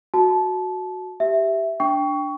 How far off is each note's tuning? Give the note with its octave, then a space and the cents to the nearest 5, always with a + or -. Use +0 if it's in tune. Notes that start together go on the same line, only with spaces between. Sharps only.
F#4 -5 A5 -25
G4 -5 E5 +0
D4 +0 G5 +5 C#6 +20